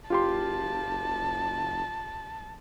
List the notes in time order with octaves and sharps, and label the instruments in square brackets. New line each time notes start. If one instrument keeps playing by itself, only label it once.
[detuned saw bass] F#1 [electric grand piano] F4 G4 C6 [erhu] A5